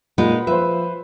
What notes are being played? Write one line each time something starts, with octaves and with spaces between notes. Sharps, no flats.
A#2 G#3 D#4 B4 F#5
F3 B4 C5 E5